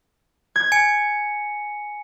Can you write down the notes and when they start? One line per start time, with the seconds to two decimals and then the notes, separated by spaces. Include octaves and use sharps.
0.56 G#6
0.72 G#5 C#7